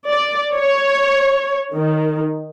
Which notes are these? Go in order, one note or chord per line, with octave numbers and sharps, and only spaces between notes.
D5
C#5
D#3